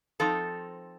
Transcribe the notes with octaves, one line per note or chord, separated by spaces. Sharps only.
F3 C4 D#4 A4